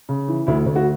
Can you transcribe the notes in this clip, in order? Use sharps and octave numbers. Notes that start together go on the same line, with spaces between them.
C#3
E3
D2 E4
D2
F#4